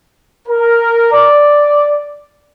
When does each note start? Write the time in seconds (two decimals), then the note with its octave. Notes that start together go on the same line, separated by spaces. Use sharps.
0.48 A#4
1.12 D5